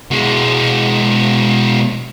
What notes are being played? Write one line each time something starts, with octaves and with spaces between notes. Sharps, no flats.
B2 G#3